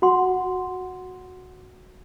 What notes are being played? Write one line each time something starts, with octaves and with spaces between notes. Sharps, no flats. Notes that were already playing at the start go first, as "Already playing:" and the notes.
F#4 F#5 C6